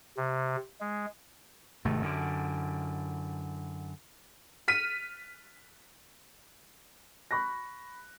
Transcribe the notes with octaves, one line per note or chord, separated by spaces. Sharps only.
C3
G#3
G#1 C3 A3
F#2 D3
F6 B6 D#7
B5 C#6 F#6 A#6